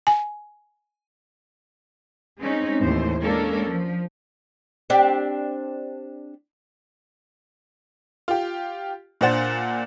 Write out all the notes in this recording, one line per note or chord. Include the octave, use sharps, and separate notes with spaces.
G#5
G#3 C4 C#4 D#4
D#2 A2 E3 C5
G#3 A#3 C#4 D4 A4 A#4
F3
C4 D4 G4
F4 G4
A#2 D4 C5 F#5 A6